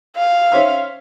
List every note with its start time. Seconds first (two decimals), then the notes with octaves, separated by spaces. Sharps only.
0.17 F5
0.52 C#4 C5 E5